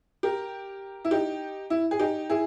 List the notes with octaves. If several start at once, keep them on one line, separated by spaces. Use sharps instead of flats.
G4 A#4
E4
D#4 G4
E4
G#4
D#4 G4
E4 G#4